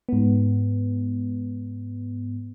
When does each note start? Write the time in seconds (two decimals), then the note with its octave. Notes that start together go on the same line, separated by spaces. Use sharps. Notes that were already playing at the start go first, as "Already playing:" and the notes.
0.09 G#2 B3